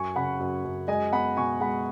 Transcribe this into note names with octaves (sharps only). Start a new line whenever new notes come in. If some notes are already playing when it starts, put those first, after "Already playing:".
Already playing: F#2 G#5 C#6
C#3 F#5 B5
F#2
F#2
G#3 D#5 G#5
B3 F#5 B5
B2 G#5 C#6
G#3 F#5 B5